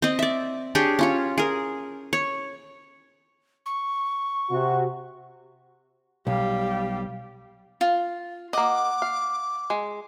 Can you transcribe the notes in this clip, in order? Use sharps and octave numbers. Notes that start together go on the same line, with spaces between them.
C4 D#5
D5 E5
D4 G4 G#4 C#5
C#4 F4 C#5
G#4 A#4
C#5
C#6
C3 F#4
B1 G3 G4 F5
F4
A#3 D#5 F#5 D6
F5
G#3